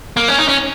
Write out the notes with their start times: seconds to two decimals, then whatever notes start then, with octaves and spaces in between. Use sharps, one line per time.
0.17 A#3
0.28 C#4
0.38 D#4
0.49 C#4